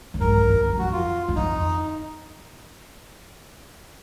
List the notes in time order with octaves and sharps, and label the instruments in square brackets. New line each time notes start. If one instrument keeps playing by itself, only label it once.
[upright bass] F#2
[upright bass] G#2 [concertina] A#4
[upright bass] F#2
F2
F#2
[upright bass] F2 [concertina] F#4
[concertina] F4
[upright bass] F#2
[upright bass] F2 [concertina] D#4